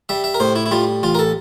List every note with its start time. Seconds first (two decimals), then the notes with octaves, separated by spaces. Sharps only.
0.09 G3 E5
0.24 E5
0.34 A#4
0.40 A2 C5
0.56 E4
0.66 E4
0.71 G3 F4
1.03 A1 F4
1.15 A#4
1.19 A4